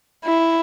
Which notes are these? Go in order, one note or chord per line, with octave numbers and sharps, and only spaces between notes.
E4